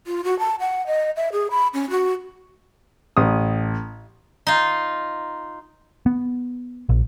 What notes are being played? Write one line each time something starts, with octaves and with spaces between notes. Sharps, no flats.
F4
F#4
A5
F#5
D#5
E5
G#4
B5
C#4
F#4
A1 D#6
D#4 F4
B3
A#1